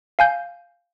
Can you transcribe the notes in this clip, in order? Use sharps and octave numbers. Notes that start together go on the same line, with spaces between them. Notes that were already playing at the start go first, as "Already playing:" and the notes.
F5 G#5 G6